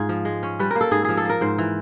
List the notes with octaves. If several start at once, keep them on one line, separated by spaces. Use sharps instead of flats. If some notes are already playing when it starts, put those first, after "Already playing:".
Already playing: G#2 F4 G#4
F3
G#3
C#4
G3 B4
A#3 A#4
A4
G#2 G#4
F3 G#4
A4
A#3 A#4
G#2 C5
E3